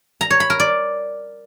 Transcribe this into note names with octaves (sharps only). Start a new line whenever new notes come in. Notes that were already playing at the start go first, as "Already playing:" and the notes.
A#5
C#5
B5
A#4
D5